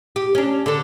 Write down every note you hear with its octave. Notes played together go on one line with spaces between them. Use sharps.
G4
C#4 D4
D3 A4